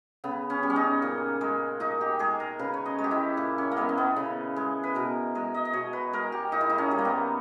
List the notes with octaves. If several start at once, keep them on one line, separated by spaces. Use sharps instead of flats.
C#3 B3
C#4
G3
C#4
D#4
A#2
G#3
A#2 D#4
G4
G#3 G#4
A#4
C#3 B4
C#5
D#5
G#3
G4
E4
A#2
C#4
A#3
G#3 B3
C#4
B3
C#3
G#3
B4
B2 A#4
G#3 D#5
D#5
D#5
B2 C#5
B4
G#3 A#4
G4
A#2 D#4
E4
D#4
C#4
G3
A#3
B3